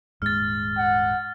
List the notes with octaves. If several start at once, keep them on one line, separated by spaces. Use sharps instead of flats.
D#1 G#2 G#3 F6 A6
F#5